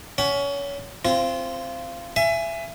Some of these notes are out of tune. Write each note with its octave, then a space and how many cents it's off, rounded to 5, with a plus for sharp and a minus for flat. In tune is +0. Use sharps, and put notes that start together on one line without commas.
C#4 +25 F#5 +35
C4 +0 F4 -25
E5 +25 G#5 +0